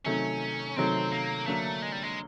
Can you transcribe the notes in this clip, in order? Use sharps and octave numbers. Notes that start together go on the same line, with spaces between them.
C3 D#3 F#3 A3 C#4
C3 D#3 F#3 A3 C4
A#3
D3 F#3 A3 A#3 D4
G#3
G3
G#3